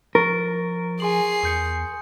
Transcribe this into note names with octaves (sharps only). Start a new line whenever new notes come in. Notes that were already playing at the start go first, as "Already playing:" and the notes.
F3 A#4 C#6 A6
G#4 G#5 C6 C7 F#7
E2 D#6 G6 C#7